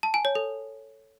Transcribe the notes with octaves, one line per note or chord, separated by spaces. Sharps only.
A5
G#5
C#5
A4